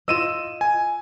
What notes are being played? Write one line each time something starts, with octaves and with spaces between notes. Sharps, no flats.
F4 D#5 E6 D#7 E7
G#5